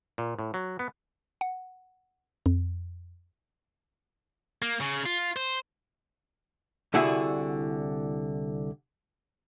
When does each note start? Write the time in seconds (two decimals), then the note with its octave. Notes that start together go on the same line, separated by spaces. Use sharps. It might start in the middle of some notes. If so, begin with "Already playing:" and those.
0.18 A#2
0.39 A2
0.54 F#3
0.79 B3
1.41 F#5
2.46 F2
4.62 A#3
4.81 C#3
5.06 F4
5.36 C5
6.94 C2 D3 E4 F#4 G#4 E5